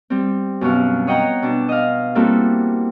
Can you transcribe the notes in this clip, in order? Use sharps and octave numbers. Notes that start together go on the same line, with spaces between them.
G3 C4
F#2 B2 F#4 F5
C#5 D#5 F#5 G5 A#5
B2 D4
D#5 F5
G3 A#3 C4 E4 F#4 A4